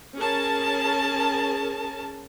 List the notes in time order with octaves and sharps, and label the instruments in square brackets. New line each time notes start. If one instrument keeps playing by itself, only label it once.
[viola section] C#4 G#4 A#4 A5